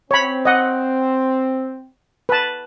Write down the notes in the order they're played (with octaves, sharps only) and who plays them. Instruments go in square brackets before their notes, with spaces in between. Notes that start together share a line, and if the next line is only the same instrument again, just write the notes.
[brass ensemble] C4 [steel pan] C#5 B5
[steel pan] D#5 F#5
B4 A5